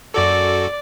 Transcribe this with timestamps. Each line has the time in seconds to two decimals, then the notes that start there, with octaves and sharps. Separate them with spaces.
0.14 F#2 F#4 A4 D5